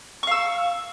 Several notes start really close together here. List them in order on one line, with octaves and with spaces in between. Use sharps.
C#6 F5 E6